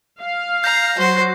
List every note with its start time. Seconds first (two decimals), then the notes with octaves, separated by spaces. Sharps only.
0.21 F5
0.64 A#5 G6 A#6 C7
0.99 F#3 F#4 C5